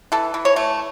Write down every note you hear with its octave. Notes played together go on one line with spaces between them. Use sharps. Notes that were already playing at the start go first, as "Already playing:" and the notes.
E3 A4
E3
C#5
A3